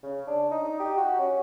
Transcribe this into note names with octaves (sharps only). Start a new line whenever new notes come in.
C#3
D4
D#4
G4
F#4
C#4